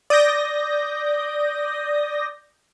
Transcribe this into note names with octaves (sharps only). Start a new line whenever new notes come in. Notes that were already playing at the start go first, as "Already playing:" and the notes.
D5 D#6 G6 A#6